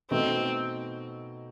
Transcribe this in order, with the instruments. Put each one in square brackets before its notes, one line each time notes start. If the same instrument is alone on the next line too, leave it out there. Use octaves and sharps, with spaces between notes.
[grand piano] B2 A3 D#4 [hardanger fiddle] C4